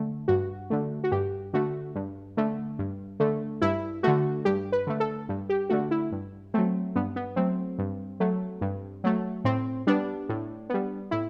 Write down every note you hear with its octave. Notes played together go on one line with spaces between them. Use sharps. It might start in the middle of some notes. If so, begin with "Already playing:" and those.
Already playing: D3 A3
G2 F#4
D3 A3
F#4
G2 G4
D3 A3 F#4
G2
D3 A3
G2
D3 A3
G2 E4
D3 A3 F#4
G2 G4
B4
D3 A3
A4
G2
G4
D3 A3 F#4
E4
G2
F#3 A3 C4
G2 B3
B3
F#3 A3 C4
G2
F#3 A3
G2
F#3 A3
A2 C4
G3 B3 D4
A2
G3 B3
A2 E4